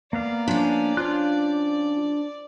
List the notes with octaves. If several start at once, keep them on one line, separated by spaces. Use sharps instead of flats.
A#3 B3 D5 F5
F3 C#4 D4
D4 F4 C5 F#6